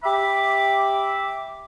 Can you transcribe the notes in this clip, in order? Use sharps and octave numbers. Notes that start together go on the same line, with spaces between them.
G4 E5 B5 D6